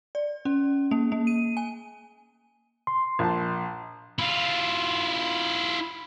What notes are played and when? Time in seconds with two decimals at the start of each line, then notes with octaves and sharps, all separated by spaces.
0.15 D5
0.45 C#4
0.91 A#3
1.12 A#3
1.27 D#7
1.57 G#5
2.87 C6
3.19 A#1 A5
4.19 E4 F4